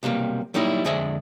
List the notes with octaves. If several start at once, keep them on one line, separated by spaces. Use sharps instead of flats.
B1 C3 G3 A#3
F#3 G3 A#3 D#4 E4
F2 D3 G#3 G#4 D5 E5